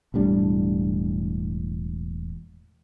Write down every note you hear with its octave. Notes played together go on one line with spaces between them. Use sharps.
E1 A2 G3 D4